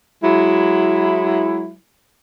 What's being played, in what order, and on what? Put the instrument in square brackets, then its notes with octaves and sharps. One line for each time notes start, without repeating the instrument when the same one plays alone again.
[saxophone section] F#3 G#3 E4